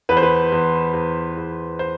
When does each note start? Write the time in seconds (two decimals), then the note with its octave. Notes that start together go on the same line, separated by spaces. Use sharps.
0.09 E2 B4
0.17 C5
0.23 B4
0.52 E2
0.93 E2
1.37 E2
1.79 C5